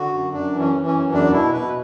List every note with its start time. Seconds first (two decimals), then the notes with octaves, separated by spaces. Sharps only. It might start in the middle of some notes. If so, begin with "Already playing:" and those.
Already playing: D3 F#4
0.13 F#2
0.33 F#2 D4
0.53 E3
0.59 C#4
0.73 E3
0.86 C#4
0.93 F#2
1.12 E2 D4
1.32 B2 E4
1.53 B2 B4